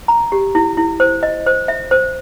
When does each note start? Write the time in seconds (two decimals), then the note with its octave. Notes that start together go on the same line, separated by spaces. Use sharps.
0.08 A#5
0.32 G4
0.55 E4
0.77 E4
1.00 C5
1.23 D#5
1.47 C5
1.68 E5
1.91 C5